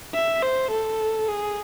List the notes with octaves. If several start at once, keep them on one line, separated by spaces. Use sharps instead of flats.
E5
C5
A4
G#4